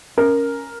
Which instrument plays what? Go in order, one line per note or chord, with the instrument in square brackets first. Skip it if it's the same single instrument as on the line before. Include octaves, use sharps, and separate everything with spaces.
[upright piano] C#4 A#4